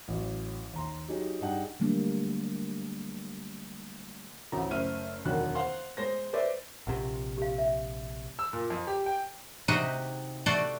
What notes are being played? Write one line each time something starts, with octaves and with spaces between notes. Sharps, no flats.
A1 F#3
D#2 A#5 C6
F#3 D#4 G4 G#4
G2 D#4 G#4 F#5 G5
D3 F#3 G3 A3 A#3 D4
A1 D2 C4 A#5
F#1 A3 C5 E5 F6 D#7
E1 D2 D3 D#3 F#3 F#6
C5 F5 F#5 C6
G#3 C5 A#6
B4 C5 D5 E5
A#1 C3 F#5
G4 F5
E5
E6
A#2
F2
G4
G5
C3 D#4 F#4 G4 D#5 F#5
A3 F#4 D5 F#5 A5 C6